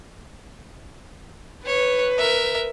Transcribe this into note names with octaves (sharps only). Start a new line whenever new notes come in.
B4 C#5
A#4 E5